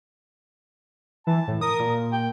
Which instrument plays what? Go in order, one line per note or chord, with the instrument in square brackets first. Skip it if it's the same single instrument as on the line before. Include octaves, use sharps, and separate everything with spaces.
[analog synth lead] E3 [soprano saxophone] A5
[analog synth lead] A2
[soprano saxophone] A#4 [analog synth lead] D#6
[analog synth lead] A#2
[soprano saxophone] G5